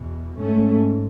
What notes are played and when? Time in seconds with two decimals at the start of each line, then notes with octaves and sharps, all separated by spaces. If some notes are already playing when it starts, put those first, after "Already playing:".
Already playing: E2 B2
0.39 G#2 A3 C#4